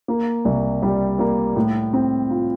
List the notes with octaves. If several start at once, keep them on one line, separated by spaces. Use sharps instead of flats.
A#3
C2
G3
A#3
A2
C4
F4